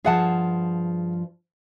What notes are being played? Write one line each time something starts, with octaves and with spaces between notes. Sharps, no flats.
G2 F3 G#4 F#5 A5